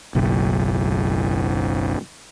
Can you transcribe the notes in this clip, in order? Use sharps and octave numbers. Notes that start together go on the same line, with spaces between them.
F#1 B1